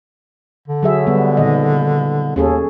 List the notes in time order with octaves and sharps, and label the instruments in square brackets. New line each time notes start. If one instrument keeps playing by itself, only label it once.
[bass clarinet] D3
[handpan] F#3 G#4 E5
G3 B3
A#2 D#3 D#5
[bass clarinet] D#2 [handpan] C#4 G#4 A4